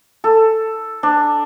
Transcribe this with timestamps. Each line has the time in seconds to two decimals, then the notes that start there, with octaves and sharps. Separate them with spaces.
0.24 A4
1.03 D4